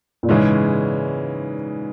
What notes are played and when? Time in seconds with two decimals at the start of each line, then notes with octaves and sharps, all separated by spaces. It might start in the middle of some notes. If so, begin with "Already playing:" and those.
0.23 A#2
0.29 G#2 C#3 E3 G#3 C#4